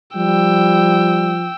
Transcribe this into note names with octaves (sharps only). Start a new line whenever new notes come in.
F3 G3 G5 E6